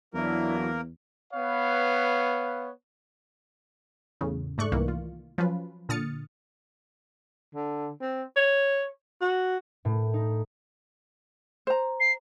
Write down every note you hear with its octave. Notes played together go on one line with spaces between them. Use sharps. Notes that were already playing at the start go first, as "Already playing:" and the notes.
E2 F#3 A#3 D4 E4 F#4 A#4
B3 B4 C#5 F5
E2 A2 C#3
G#2 A3 D5 C#6 F#6
C2 D#3 E3 A#3
F4
F3 F#3 C#4 F4 B4
A#2 D3 D#6 F6 A6 C#7
D3
C4
C#5
F#4
A2
D#4
C5 A#5
C7